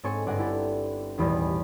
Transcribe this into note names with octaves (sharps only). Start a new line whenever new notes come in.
G#2 C4 A4 C#5 G#5 C#6
G1 D5 F#5 G#5 A#6
E4 G4 A4
D#1 A1 E2 B2 G3